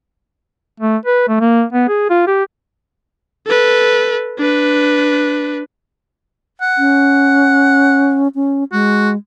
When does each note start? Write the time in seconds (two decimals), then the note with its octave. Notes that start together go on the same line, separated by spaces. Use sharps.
0.80 A3
1.06 B4
1.28 A3
1.40 A#3
1.73 B3
1.88 G#4
2.10 F4
2.27 G4
3.46 A4 B4
4.38 D4 B4
6.62 F#5
6.78 C#4
8.35 C#4
8.72 G#3 F#4